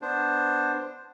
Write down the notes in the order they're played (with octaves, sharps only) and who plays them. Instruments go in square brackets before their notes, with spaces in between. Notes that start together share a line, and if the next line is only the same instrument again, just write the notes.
[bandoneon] B3 D4 C5